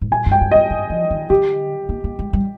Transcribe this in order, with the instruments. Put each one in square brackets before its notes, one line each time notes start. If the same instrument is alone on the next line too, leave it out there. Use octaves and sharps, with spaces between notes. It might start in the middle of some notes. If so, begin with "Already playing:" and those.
[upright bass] G#2
[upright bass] A#2 [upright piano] G#5
[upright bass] G2
[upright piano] G5
[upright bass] G2
[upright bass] G2 [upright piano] D#5
[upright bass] G2
F3
D#3
[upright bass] D3 [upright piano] G4
[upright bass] A#3
A#3
G#3
G3